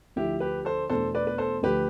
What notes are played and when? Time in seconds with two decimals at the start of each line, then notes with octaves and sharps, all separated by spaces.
0.16 D2 D3 F3 E4 G4
0.40 G4 B4
0.65 A4 C5
0.90 E2 B2 A3 D4 A4 C5
1.15 B4 D5
1.27 B4
1.38 A4 C5
1.63 D2 D3 F3 A3 G4 B4